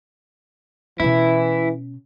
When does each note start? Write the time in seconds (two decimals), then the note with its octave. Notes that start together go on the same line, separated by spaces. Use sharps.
1.00 B2 E3 C#4 E4